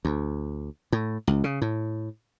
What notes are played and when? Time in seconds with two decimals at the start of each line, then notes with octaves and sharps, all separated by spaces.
0.05 D2
0.92 A2
1.27 C#2
1.44 C#3
1.62 A2